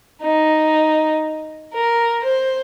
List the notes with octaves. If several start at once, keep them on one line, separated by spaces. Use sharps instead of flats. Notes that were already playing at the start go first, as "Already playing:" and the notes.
D#4
A#4
C5